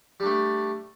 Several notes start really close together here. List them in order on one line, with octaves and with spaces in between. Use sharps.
G3 D4 A3